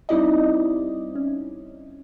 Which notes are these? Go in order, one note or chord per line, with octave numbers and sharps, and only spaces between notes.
G3 C4 D#4 E4 D5 D#5
C#4